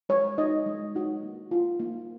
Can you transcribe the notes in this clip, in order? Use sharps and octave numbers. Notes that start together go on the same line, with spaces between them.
G#3 C#5
D#4 F#4 D#5
G#3
D#4 F#4
A#3
F4
A#3